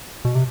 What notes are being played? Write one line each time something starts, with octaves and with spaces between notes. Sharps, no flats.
B2
C3